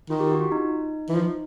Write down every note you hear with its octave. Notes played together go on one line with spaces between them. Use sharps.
D#3 F4
G4
F#4
F4
D#4
E3
F3